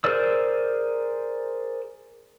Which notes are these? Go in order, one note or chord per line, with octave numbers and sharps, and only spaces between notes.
G#4 A#4 C5 D5 E6